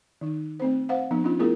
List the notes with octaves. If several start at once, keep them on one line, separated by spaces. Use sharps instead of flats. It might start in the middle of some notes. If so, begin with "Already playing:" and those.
D#3 D#4
A3 C4 C5
C5 F5 F#5
F3 B3 D#4
C#4 D4 F4
A3 B3 E4 F4 G#4 A#4